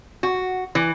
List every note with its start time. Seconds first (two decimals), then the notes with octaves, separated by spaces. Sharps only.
0.23 F#4
0.75 E3